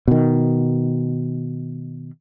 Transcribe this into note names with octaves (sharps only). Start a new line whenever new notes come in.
B2 D#3